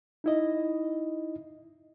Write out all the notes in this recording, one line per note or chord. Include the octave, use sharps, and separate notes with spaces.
D#4 E4 D#5